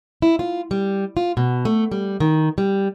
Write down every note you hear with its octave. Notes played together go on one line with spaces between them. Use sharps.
E4
F4
G3
F4
B2
A3
G3
D#3
G3